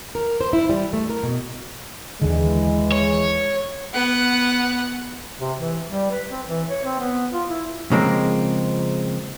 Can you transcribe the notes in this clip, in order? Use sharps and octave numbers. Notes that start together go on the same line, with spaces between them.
A#4
C5
E4
G3
A3
A#4
B2
D#2 D3 E3 G#3
C#5
B3 F#5
C3
E3
G3
B4
C4
E3
C#5
C4
B3
F4
E4
C#3 F3 G#3 A#3 C4